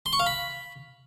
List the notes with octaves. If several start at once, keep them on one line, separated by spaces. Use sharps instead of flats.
C6
C#6
F5
B5